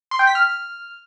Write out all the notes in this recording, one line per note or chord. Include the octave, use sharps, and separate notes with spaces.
C6
G5
B6
F6